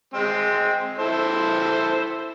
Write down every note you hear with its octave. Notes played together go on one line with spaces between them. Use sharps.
G#3 C4
E4 A4 C5